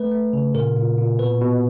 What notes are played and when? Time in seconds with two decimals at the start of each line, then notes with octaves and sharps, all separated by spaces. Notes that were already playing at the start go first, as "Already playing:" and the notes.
Already playing: A3 B4
0.12 A3
0.33 C#3
0.55 A#2 A#4
0.76 A#2
0.98 A#2
1.19 B2 B4
1.41 B2